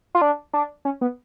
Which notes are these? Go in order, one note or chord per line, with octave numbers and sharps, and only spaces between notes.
F4
D4
D4
C#4
B3